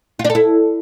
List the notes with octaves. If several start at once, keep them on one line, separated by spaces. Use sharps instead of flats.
F4
D4
A4
E4